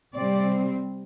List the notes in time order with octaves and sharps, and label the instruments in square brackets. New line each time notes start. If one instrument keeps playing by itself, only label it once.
[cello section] C3 G3 C4 D5